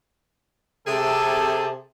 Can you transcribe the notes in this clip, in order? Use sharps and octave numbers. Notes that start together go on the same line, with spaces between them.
C3 G#4 A4